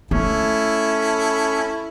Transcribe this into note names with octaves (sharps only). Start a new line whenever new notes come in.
A3 C#4 E4 A4